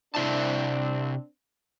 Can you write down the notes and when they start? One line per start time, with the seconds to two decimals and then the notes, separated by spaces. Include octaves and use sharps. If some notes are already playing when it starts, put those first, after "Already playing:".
0.15 C3 C4 D4 E4 A5